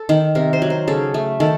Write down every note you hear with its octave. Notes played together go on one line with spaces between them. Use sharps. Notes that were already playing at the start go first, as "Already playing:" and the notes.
Already playing: A4
D#3
C3 A#4
C5
F#3
C5
C#3 A4
A3
D#3 A4